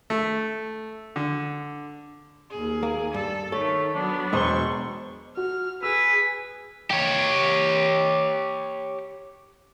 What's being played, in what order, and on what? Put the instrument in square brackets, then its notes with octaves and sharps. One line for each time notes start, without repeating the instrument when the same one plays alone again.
[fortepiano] A3
D3
[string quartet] D#2 G#4
[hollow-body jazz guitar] A#3
[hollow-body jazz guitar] G2 [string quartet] A4
[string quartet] D#3 A3 [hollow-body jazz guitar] A4 [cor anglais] C#5
[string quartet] F#3 B3 [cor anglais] D4
[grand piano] E1 C5 G7 [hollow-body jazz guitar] G#3 B3 D#5 [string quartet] C#6
[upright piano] F#4 [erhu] F6
[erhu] G#4 [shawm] B4 [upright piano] E6
[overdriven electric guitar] G4 C#5